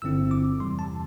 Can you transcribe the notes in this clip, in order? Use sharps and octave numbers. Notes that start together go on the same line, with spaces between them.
G1 G2 D3 C4 E4 E6
D6
E2 C3 E3 G3 C6
A5